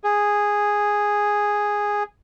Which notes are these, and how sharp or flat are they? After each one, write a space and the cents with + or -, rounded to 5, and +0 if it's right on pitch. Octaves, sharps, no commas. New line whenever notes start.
G#4 -5